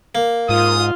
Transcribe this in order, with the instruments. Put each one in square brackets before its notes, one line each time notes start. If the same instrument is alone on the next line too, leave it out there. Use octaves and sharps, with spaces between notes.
[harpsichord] A#3
[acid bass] G#2 [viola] F4 [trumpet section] D#6